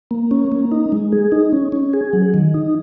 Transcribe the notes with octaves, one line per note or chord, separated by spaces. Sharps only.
A#3
C#4
A#3
D#4
G#3
G#4
D#4
C#4
C#4
G#4
F#3
D#3
D#4